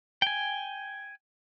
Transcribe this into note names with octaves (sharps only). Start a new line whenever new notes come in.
G5 G#5